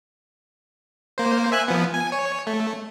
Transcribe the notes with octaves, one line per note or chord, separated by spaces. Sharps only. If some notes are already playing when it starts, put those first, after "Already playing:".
A#3 C5
E5 G#5 F#6
F3 B3
G#5
C#5
A3